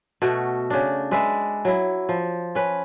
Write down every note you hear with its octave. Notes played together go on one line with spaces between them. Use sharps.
B2 A3 F#4
C#3 D4
G#3 B4 D5 E5
F#3 E4
F3
C#4 B4